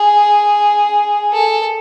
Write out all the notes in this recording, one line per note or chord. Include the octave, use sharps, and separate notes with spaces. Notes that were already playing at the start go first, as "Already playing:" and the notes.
Already playing: G#4
A4